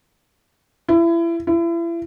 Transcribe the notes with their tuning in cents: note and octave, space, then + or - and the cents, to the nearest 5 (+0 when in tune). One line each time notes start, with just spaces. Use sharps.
E4 +30
E4 +35